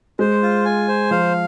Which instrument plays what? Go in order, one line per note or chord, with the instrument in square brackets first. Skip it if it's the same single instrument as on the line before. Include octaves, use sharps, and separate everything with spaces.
[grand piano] G#3 [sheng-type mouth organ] C5
[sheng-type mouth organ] F4
G#5
C5
[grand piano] F3 [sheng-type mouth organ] F5